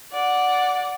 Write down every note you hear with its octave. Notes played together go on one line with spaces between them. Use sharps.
D5 F#5